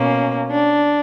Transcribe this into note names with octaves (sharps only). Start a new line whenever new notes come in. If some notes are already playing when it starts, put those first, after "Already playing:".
Already playing: B2 A#3 C#4
D4